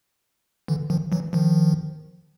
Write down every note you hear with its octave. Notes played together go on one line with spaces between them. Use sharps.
D3 E3
D#3 F3
E3 F#3
D#3 F3